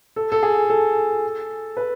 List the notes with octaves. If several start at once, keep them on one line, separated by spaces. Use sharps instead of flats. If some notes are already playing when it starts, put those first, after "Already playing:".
A4
A4
G#4
A4
B4